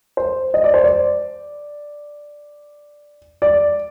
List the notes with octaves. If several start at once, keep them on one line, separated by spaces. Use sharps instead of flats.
C5
D#5
D5
C5
D5
D5